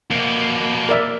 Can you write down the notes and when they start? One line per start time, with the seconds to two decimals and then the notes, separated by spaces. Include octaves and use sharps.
0.11 F2 B2 A#3
0.89 A#4 D5 E5